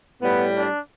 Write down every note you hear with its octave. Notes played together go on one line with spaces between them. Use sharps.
A2 G3 B3
D4